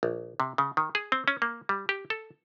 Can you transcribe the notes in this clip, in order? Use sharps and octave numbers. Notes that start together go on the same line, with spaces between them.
A#1
C3
C#3
D#3
G#4
C4
C#4
A#3
G3
G4
A4